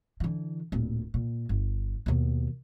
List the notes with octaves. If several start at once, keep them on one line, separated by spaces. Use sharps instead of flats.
D3 E3
D1 A#2
A#2
G1
D#2 B2